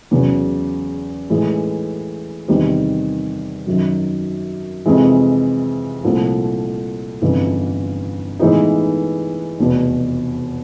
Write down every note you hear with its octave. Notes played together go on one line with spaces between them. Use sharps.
E2 C#3 F#3
A2 E3 G#3
E2 C3 D#3 G3
F#2 D#3 F#3
F2 C3 E3 G#3
C2 A#2 F3 A3
G1 F2 C#3 E3
A2 E3 G#3 B3 D#4
F1 E2 B2